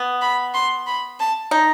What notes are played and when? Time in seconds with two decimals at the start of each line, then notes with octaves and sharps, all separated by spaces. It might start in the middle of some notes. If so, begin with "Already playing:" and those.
Already playing: B3
0.22 B5
0.54 C6
0.87 B5
1.20 A5
1.51 D#4